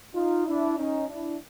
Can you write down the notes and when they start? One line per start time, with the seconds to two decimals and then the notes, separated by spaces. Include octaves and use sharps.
0.15 D#4 F4
0.46 D4 E4
0.78 C#4 D#4
1.08 D4 E4